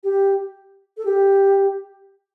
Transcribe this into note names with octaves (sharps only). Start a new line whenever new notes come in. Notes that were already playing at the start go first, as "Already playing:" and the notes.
G4
A4
G4